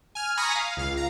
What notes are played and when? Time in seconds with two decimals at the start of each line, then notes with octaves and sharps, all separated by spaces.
0.15 G#5 F6
0.37 G#5 A#5 B5 C#6 D#6 A#6
0.55 F5
0.77 C#2 F5
0.95 C#2 A#5